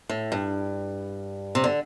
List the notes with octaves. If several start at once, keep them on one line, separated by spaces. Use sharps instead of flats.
A2
G2
C3
D3